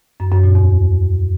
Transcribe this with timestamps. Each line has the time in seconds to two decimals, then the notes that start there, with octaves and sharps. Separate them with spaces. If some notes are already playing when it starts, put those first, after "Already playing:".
0.20 F#2
0.32 F#2
0.43 A#2
0.55 E2